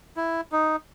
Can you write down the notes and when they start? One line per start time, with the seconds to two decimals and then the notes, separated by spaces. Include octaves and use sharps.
0.17 E4
0.52 D#4